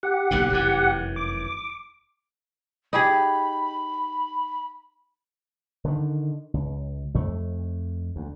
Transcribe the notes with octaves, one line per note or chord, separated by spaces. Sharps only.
G4 F#5
F#1 B1 A2
F1 F#2 E3
D6
D#4 G4 G#4 B5
D3 D#3
C#2
F2 A3
D2